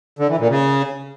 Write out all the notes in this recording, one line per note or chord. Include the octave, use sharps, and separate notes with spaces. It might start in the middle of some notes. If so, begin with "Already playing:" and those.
D3
E3
A#2
C#3